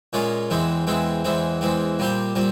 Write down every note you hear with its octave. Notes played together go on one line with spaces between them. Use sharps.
A#2 G#3 C#4 F4
E2 E3 G#3 C4
E2 E3 G#3 C4
E2 E3 G#3 C4
E2 E3 G#3 C4
A#2 G3 C4 G4
A#2 G3 C4